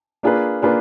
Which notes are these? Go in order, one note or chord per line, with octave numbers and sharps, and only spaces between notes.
A#3 D4 F4 G#4 B4
A#3 D4 F4 G#4 B4